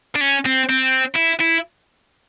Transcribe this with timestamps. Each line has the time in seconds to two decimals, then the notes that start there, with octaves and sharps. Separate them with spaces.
0.16 D4
0.21 C#4
0.46 C4
0.69 C4
1.16 E4
1.41 E4